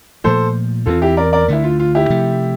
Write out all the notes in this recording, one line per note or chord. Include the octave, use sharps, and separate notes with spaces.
A#2 F3 A3 A4 C5
E2 E3 G3 C4 F4 A4
E4 G4
A#4 D5
A#4 D5
D2 D3 A3 E4
F4
F4
E4 G4
C3 F3 A3